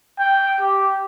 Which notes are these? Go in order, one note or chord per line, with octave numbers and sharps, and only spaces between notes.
G5
G4